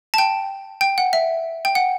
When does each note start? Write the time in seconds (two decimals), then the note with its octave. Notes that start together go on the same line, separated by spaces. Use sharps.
0.14 A5
0.18 G5
0.81 G5
0.98 F#5
1.13 E5
1.65 G5
1.75 F#5